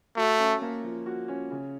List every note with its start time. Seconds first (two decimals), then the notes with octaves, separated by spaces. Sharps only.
0.17 A3 F#4
0.39 C#4
0.61 A#3
0.83 F3
1.06 F#4
1.28 C#4
1.50 C#3